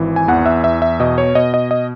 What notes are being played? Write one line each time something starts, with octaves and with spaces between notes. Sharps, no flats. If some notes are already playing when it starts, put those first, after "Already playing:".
Already playing: G#1 E3
G#5
E2 F#5
E5
E2 E5
E5
B2 D#5
C#5
B2 D#5
D#5
D#5